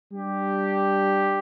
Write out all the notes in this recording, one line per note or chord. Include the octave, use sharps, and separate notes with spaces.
G3 D4 G4